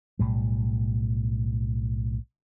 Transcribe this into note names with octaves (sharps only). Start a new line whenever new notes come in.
B1 A2 G3